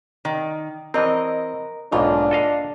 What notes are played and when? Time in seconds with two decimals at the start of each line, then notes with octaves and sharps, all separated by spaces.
0.25 D#3
0.94 E3 C4 A#4 D#5
1.92 B1 G#2 B2 A#3 D4 F4
2.31 A4 D#5 F5